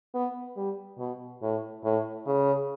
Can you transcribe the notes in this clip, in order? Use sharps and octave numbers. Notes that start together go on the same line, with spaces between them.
B3
G3
B2
A2
A2
C#3